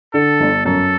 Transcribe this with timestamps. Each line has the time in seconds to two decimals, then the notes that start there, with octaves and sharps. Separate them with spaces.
0.14 D3 A4
0.40 G1
0.65 F#2 A4